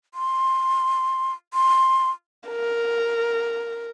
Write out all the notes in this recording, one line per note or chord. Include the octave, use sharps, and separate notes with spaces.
C6
C6
A#4